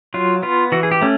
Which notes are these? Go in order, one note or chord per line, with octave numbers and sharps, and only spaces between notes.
F#3 F4
B3 F4
E3 F#4
G#4
G4
A3 C#4